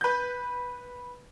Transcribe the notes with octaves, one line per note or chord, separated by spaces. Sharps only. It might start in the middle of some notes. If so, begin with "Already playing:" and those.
B4 G6